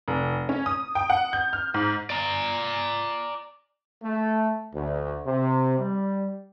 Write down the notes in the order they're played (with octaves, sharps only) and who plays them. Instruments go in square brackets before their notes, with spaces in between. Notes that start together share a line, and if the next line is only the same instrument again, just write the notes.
[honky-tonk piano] F1
C#4
D#6
G5
F#5
G6
F6
G#2
[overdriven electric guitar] D5 A#5
[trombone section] A3
D2
C3
G3